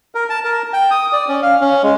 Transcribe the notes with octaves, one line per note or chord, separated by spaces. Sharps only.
A#4
A5
A#4
G5
D#6
D5
C#4
F5
C#4
G#3